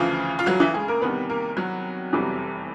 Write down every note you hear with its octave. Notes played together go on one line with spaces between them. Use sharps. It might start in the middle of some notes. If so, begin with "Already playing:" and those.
Already playing: D2 C#3 E3 F3 F4
F4
F#3 F#4
E3 E4
G#3 G#4
A#3 A#4
E2 C3 D#3 G3 B3 B4
A#3 A#4
F#3 F#4
F1 E2 C3 E3 G3